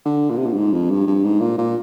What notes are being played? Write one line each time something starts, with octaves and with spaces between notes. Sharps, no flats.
D3
A#2
C3
A#2
G2
G#2
F2
G2
G2
G#2
A#2
A#2